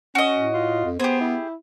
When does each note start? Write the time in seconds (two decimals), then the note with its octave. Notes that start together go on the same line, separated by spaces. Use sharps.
0.15 C#4 F#4 D#5
0.36 A2
0.53 F4
0.84 F2
1.00 B3 G4 G#4 C5
1.20 E4